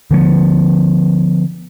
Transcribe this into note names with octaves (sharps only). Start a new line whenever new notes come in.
D3 F3 A3 B3